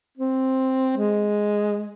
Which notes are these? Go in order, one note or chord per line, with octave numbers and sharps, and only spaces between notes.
C4
G#3